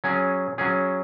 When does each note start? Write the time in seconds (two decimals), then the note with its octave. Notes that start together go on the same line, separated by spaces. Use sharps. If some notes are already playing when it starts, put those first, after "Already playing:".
0.04 F#3 C#4 G#4
0.58 F#3 C#4 G#4